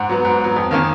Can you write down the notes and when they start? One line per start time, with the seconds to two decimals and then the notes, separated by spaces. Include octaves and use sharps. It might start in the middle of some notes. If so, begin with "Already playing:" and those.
Already playing: G#2 F#5
0.09 F#3 B3
0.25 G#2
0.40 F#3 B3
0.56 F2
0.71 D#3 A#3 C#4